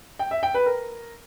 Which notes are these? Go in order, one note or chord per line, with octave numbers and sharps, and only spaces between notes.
G5
E5
G5
B4
A#4